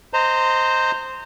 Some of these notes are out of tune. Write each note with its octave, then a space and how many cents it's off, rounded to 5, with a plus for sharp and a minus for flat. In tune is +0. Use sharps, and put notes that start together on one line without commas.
C5 -5 D#5 +0 A#5 -25